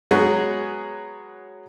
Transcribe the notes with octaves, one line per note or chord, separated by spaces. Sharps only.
F#3 G#3 B3 C#4 G#4